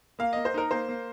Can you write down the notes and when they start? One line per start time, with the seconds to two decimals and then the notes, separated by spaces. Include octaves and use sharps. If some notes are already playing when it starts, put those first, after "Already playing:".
0.19 A#3 F5
0.33 A#3 D#5
0.45 C5
0.54 D#4 A#4
0.71 A#3 C5
0.89 A#3